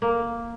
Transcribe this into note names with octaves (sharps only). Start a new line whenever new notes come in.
A#3